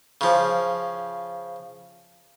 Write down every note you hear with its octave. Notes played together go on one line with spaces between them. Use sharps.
C#3 F3